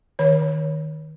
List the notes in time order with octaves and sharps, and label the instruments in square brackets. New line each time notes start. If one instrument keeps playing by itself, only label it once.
[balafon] D#3 C#5
D#3